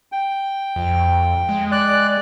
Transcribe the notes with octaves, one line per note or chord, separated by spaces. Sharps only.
G5
F2
G#3
D5 F#6